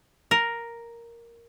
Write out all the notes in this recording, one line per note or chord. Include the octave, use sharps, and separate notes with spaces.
A#4